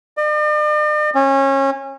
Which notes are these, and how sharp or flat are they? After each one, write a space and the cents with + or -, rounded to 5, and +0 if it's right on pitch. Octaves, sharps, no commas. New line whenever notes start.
D5 +45
C#4 -25